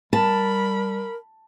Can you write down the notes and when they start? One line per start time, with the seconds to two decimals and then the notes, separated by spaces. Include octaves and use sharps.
0.13 G3 A#4 A5 B5